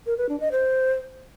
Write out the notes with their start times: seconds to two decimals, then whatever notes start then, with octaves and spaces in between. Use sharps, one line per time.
0.06 A#4
0.18 B4
0.29 D4
0.40 D#5
0.52 C5